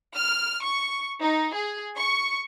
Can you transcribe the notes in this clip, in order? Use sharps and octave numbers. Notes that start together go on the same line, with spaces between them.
F6
C#6
D#4
G#4
C#6